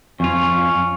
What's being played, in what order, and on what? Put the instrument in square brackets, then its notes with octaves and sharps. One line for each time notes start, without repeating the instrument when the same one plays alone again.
[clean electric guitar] F2 F4 [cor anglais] C#4